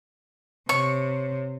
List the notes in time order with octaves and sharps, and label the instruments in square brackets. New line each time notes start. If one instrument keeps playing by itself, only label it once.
[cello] C3 [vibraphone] C#5 [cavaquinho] C#6